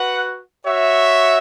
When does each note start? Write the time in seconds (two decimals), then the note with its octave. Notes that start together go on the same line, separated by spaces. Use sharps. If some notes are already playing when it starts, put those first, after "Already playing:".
Already playing: F#4 B4 F#5
0.65 F#4 C#5 E5